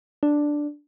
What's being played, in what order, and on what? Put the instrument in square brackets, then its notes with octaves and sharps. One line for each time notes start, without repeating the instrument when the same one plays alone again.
[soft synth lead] D4